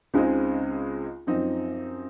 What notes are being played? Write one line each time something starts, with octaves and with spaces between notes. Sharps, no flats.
C#2 C#3 G#3 C4 D#4
F#2 F3 C4 D#4